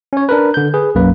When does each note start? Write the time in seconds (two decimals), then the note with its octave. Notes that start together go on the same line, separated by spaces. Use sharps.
0.13 C#4 C#5
0.29 D4 A#4 B4
0.54 D3 G6
0.74 G#4 B4
0.95 B1 F#2 A#3 B4